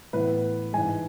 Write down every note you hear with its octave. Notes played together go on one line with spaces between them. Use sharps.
A2 E3 B3 B4
G#2 E3 G#3 G#5